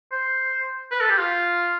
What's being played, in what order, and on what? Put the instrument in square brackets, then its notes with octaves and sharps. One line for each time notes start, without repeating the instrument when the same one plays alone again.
[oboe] C5
B4
A4
G4
F4